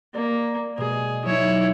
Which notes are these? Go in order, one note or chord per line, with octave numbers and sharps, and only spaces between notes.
A#3 D5
B2 G#3 G#4
F#3 D#4 E4 C#5